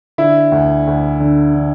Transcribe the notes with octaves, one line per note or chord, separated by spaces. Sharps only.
D3 E4
D2
D2
D3
D3